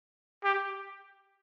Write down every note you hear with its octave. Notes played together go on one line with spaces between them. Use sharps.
G4